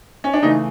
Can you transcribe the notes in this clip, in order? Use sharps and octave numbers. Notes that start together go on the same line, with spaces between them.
C#4
D4
C#3 E3 A3 D#4